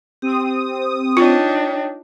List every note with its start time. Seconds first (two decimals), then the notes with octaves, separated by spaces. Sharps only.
0.22 C4 G4 D#6
1.17 D4 D#4 F4 C#5 G5